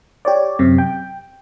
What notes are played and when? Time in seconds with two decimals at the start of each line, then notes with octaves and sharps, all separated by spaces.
0.25 G4 C#5 D5
0.59 F#2 C3
0.78 G5